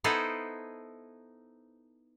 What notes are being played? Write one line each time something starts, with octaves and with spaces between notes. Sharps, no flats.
B3 D#4 E4 A4 C5